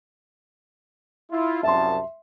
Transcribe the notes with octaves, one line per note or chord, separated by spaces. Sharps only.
E4 F4
C2 F#2 E5 A5 C6